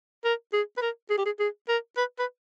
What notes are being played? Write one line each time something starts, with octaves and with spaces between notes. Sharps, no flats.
A#4
G#4
B4
A#4
G#4
G4
G#4
G#4
A#4
B4
B4